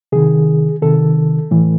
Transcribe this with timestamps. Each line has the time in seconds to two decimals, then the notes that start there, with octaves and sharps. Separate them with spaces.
0.12 C3 D#3 G#4
0.82 C3 D#3 A4
1.51 A2 E3